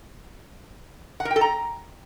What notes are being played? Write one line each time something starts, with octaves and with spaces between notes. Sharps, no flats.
F#5
A#4
G5
A4
A#5